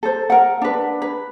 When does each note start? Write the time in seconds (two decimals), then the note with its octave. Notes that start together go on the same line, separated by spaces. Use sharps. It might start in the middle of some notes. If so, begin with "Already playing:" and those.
0.03 A4 C5
0.30 A#4 F#5
0.62 D4 B4
1.02 B4